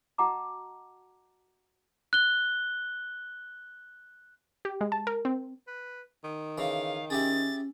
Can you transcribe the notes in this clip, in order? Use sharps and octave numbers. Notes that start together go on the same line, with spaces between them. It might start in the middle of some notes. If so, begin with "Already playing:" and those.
F#4 D#5 F#5 A5 A#5 D6
F#6 G7
G4
G#3
A5
A#4
C4
B4
D#3
C#3 E3 F5
C#4 E4 G4 G#4 A6